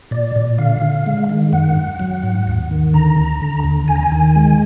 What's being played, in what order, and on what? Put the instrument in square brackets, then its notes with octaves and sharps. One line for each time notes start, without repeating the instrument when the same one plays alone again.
[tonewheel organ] A#2 D5
A#2
D3 F5
D3
G#3
D#3
F#2 F#5
F#2
F#3
G#2
D#2
D#3
D3 A#5
D2
D3
D#2
D#2 G#5
A#5
G#5
D#3
G#3